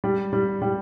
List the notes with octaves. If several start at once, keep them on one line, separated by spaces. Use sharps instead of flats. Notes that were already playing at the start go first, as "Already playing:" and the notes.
G3
G3
G3